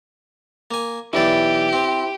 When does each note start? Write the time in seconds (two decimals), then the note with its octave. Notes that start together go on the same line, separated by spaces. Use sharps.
0.71 A#3 G#5
1.13 B1 E3 E4 G4 D5
1.73 C4